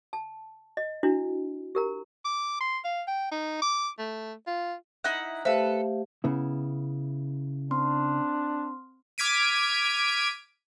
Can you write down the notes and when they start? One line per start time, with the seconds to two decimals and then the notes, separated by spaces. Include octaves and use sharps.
0.13 A5
0.77 D#5
1.03 D4 E4 F#4
1.75 G4 A#4 A#5
2.25 D6
2.61 C6
2.85 F5
3.08 G5
3.32 D#4
3.62 D6
3.99 A3
4.47 F4
5.04 D#4 E4 F#5
5.45 A3 G4 A4 B4 C5 E5 F5
6.24 C#3 B3 E4
7.71 C4 D4 C6 F6
9.18 D6 F6 G#6 B6 D7 D#7